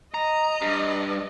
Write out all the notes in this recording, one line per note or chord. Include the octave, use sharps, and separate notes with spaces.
D#5 A#5
G2